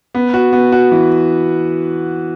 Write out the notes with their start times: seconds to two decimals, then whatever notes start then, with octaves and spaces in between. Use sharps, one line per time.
0.15 B3
0.34 F#4
0.53 B3
0.72 F#4
0.92 E3